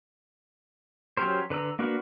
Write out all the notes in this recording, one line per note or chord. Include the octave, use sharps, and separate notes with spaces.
F#3 C#4 G4 A#4 C5
D3 B4 A#5 E6
A#3 D4 F#4 A#4 B4